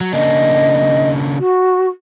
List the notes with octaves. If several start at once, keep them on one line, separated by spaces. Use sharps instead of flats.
F#3
C#3 A#3 D4 D#5
F#4